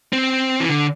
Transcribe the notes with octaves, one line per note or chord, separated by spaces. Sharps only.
C4
E3
D3